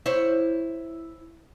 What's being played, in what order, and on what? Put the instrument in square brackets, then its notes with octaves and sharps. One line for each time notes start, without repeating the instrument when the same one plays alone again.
[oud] E4 C5 C#5